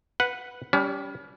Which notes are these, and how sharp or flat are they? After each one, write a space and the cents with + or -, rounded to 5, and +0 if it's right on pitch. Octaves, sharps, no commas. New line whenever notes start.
B4 +0 F#5 -5
G3 +0 C#4 +35